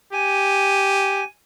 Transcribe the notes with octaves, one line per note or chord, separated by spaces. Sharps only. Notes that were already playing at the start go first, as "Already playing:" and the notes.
G4 G#5